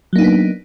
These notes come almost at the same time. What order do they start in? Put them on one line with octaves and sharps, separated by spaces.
F#3 A#3 D#4 D4 B3